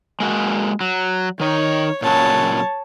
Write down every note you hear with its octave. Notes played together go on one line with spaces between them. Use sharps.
G#3 A#3 F#4
F#3
D#3 D#4 C#5
A#2 C#3 F#3 C#5 A5